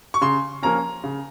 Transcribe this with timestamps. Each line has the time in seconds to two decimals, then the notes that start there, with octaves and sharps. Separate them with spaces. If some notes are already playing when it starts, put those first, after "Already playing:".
0.14 C#6
0.22 C#3 C6
0.62 F3 A#3 C#4 A#5
1.04 C#3